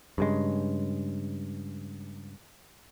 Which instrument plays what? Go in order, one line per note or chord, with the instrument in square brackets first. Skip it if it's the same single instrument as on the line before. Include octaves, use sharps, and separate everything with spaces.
[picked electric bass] G2 C#3 G#3